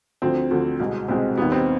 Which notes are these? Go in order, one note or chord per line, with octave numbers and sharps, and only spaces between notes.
D2 D3 F3 C4
D2 D3 F3
C2 B2 G#3
C2 B2 G#3 C4
D#2 D#3 G3 B3
C4